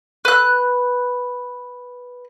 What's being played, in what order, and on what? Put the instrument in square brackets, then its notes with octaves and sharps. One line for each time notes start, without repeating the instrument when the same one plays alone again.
[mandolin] B4 F#6